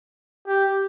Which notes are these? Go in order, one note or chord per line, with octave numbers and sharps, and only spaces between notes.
G4